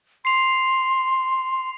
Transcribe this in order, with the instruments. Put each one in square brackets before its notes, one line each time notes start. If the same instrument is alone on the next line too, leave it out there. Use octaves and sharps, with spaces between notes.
[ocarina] C6 [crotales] C7 F7